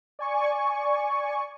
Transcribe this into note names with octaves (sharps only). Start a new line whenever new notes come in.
D5 G#5 C#6